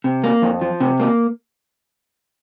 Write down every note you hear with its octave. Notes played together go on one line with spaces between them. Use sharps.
C3
A#3
F2
F3
C3
A#3